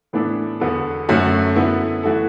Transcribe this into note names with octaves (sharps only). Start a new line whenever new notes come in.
A2 E3 B3 D4 A4
E2 D3 B3 F#4 A4
F#2 D3 F#3 A3 F#4
D3 B3 E4
E3 A3 F#4 A4